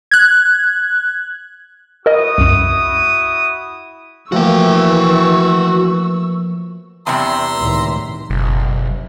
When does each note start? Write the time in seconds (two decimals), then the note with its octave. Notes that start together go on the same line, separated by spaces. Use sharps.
0.11 F#6 G#6
2.06 E4 F#4 A#4 D#5 D#6
2.38 C2 F#2
4.32 E3 F3 A3 A#3 F#4 G5 C#6 E6
7.07 E2 G2 C3 E5 A#5 C6
7.57 C#2 A2 D#3
8.30 F#1 B1